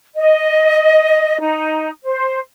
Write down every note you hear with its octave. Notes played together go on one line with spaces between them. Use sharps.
D#5
D#4
C5